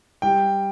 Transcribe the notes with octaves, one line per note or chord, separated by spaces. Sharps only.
G3 G5